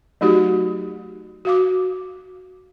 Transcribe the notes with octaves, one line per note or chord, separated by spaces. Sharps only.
F#3 A3 D#4 F#4 G4
F#4 F5 D6